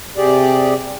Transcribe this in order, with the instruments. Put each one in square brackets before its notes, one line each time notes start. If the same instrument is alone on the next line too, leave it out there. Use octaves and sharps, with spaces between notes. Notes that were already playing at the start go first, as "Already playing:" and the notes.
[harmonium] C3 G4 G#4 D5